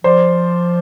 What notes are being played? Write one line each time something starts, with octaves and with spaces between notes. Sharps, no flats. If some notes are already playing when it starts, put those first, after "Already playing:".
F3 C5 D5